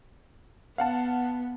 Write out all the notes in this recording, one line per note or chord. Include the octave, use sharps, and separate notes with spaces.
B3 F5 F#5 A5